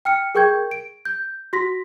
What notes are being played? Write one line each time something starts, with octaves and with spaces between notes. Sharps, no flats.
G5 F6 C#7
G#4 A#4 G5 C#6 G6 G#6
D7
G6
F#4 C6 A#6 B6